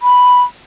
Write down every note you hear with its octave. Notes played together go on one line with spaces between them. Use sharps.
B5